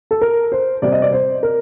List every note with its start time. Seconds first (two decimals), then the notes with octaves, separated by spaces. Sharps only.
0.11 A4
0.21 A#4
0.52 C5
0.82 C3 G3 C4 D5
0.92 D#5
1.02 D5
1.12 C5
1.43 A#4